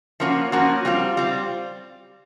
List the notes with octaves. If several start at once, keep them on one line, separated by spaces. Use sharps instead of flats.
F3 A#3 C#4 F#4
F3 A#3 C#4 F#4
G3 C4 F4
G3 C4 F4